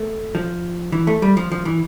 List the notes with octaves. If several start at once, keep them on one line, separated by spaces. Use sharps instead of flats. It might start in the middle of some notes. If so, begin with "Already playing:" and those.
Already playing: A3
F3
E3
A3
G3
F3
F3
E3